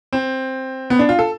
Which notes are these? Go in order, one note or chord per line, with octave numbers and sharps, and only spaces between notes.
C4
B3
D4
F4
A4